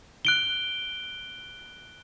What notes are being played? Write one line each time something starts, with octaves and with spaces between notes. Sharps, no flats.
F#6 D7 G7